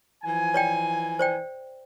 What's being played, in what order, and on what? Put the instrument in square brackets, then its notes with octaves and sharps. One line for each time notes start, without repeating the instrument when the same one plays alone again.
[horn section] E3 F3 G#5
[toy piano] C#5 D5 G5
C5 D5 G5